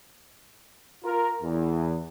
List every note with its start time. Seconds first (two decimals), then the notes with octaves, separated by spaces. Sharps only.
1.04 F4 A#4
1.42 E2